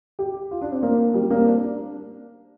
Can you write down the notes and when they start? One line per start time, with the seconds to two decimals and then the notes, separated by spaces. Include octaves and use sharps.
0.19 G4
0.51 F4
0.61 D4
0.72 C4
0.83 A#3
1.14 G3
1.30 A#3
1.39 C4
1.46 D4